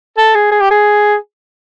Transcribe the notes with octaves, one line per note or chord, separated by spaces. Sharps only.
A4
G#4
G#4
G4
G#4